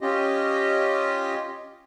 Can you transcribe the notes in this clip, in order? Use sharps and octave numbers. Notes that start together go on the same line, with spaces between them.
C#4 F4 G4 D#5